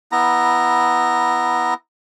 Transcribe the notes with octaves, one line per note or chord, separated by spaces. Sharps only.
B3 E4 A#5